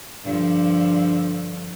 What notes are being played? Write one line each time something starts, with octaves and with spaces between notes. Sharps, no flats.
G2 D3 F3